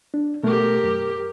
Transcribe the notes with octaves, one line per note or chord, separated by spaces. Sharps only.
D4
B2 A3 G4 A#4
F#2